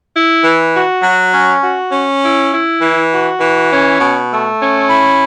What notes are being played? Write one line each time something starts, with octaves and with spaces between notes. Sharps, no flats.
E4
E3
F#4
F#3
C#4
F#4
C#4
E4
E4
E3
F#4
E3
C#4
B2
A3
C#4
E4